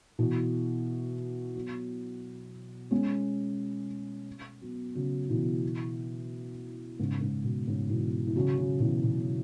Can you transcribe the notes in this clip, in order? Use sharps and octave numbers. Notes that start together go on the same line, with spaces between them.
B2 E3
F#3 B3
G#3 C#4
F#3 B3
C#3 F#3
B2 E3
G#2 C#3
G#2
B2
G#2 C#3
B2 E3
E3
C#3 F#3
C#3 F#3
B2 E3
B2
C#3